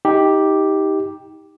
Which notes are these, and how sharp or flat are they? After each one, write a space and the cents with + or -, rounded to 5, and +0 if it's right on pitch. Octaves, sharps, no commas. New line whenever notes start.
D#4 +25 G4 +0